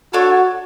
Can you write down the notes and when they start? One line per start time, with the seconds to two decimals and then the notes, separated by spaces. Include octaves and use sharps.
0.13 D4 F#4 A4 C#5